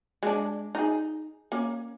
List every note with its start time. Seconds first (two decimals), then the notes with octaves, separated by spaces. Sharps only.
0.23 G#3 D4
0.75 D#4 G#4
1.52 A#3 C#4